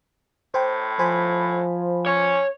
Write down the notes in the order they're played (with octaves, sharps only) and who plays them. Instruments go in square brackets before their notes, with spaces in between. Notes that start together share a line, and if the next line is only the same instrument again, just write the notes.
[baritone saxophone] A2 [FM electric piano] C5 G5
[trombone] F3 [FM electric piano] C5 G#5 B5
[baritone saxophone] C#4 [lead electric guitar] C#5